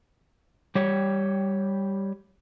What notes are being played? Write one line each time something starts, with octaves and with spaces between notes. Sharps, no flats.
G3 G4 C#5